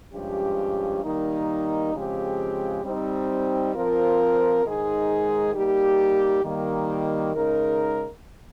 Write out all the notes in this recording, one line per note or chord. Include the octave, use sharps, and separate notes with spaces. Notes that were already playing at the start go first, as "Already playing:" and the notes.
G2 F3 G#3 C#4 G4
D#3 G3 A#3 D#4
C#3 F3 G#3 C4 G4
G3 C4 D#4
F3 C4 F4 A#4
G#2 D#3 G#3 D#4 G#4
G3 A#3 D#4 G4
D#3 G3 A#3
C#3 G#3 D#4 A#4